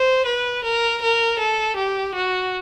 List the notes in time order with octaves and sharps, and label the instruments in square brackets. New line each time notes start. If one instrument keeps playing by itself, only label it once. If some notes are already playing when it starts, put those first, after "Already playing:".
Already playing: [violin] C5
B4
A#4
A#4
A4
G4
F#4